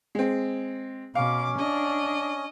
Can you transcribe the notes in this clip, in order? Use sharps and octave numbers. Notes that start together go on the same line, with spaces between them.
G#3 C4
B2 C#4 F5 D6
D4 D#5